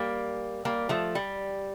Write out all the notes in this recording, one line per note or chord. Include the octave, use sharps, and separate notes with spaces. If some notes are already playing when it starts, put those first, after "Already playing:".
Already playing: G3 A#3
G3 A#3
F3 A3
G3